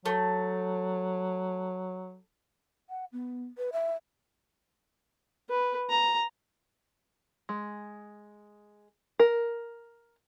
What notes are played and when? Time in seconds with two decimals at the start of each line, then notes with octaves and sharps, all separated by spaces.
0.06 F#3 A3
2.89 F#5
3.12 B3
3.58 B4
3.73 E5
5.50 B4
5.90 A#5
7.49 G#3
9.19 A#4